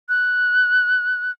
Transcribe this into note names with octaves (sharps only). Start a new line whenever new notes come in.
F#6